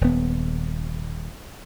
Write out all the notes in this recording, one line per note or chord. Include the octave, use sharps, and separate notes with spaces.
D#1 B3